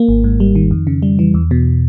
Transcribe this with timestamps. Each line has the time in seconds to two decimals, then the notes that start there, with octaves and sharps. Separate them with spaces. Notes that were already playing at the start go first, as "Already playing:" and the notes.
Already playing: A#3
0.08 G#1
0.24 G#2
0.40 G3
0.55 D#3
0.71 F2
0.87 C#3
1.02 G3
1.19 E3
1.34 E2
1.51 B2